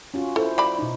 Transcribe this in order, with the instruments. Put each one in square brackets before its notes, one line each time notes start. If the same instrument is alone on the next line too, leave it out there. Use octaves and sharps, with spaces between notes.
[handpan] C#4 F4 F#4
[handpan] E4 C5 [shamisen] A4
[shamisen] F#3 D5 B5
[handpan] B2 D#4